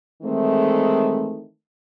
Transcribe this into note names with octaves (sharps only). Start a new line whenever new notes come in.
D#3 E3 G#3 A3 C4 D#4